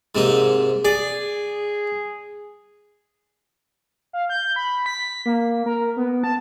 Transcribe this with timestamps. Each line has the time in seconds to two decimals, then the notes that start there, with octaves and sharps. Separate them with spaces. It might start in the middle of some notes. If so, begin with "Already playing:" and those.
0.15 G#2 C3 A#3
0.85 G#4 D5
4.13 F5
4.30 G6
4.56 B5
4.86 B6
5.26 A#3
5.66 A#4
5.97 B3
6.24 A5